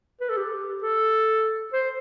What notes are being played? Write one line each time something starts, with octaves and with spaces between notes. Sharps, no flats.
B4
A4
G4
A4
C5